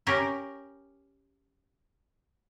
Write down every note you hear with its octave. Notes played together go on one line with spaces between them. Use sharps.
C#4 G4 A#4